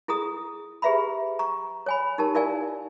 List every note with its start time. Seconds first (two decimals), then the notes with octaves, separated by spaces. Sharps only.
0.08 E4 G#4 A4 A#5 D#6
0.82 G4 G#4 B4 E5 A#5 B5
1.39 A#5 C#6
1.86 C#5 G#5 B5
2.18 D#4 G4 A#4 A5
2.35 E4 A#4 D5 F5 G#5